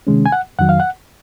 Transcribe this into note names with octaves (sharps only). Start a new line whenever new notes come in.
C3 D#3 G#3 C#4
G#5
F#5
F2 D#3 F#3 F#5
F5
F#5